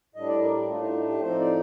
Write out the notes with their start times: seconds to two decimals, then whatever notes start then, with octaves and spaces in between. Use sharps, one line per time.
0.15 A2 G3 D4 D#5
0.28 D5
0.42 A#4
0.55 G4
0.68 A2 A3 D4 F4
0.81 D#4
0.89 F4
0.95 D#4
1.08 G4
1.21 A2 F3 C4 D#4 C5
1.39 D5